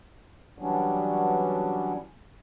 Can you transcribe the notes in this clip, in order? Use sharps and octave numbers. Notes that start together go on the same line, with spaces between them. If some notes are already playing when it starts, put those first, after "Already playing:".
E3 F#3 G3 B3 C#4 D4